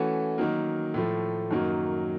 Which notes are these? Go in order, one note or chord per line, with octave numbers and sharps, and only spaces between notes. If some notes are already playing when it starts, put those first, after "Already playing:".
Already playing: E3 A3 C#4 F#4
D#3 F#3 A#3
A2 F3 A3
F#2 D#3 F#3 A#3